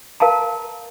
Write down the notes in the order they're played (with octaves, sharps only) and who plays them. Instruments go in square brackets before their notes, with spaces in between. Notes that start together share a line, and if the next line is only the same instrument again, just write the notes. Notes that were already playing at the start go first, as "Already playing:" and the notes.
[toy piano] A#4 F5 A5 A#5